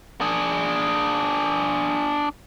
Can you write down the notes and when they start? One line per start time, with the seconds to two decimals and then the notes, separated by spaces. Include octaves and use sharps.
0.21 D4 G#4